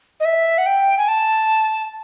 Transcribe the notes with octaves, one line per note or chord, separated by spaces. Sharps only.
D#5
E5
F#5
G5
G#5
A5